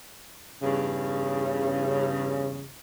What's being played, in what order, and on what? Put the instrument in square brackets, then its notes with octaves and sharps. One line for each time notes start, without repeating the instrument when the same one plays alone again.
[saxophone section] E2 G2 C#3